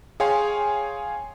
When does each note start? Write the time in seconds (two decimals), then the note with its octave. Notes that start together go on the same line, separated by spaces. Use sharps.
0.20 G#4 C#5 F5 G5 G#5 C6